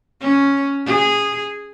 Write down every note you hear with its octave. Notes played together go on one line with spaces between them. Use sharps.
C#4
G#4